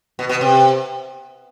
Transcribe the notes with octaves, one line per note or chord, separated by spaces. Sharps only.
B2
B2
C3